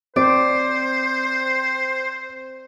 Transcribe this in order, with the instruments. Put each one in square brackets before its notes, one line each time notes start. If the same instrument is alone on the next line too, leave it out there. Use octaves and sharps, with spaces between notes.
[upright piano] C4 [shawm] C5 [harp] D5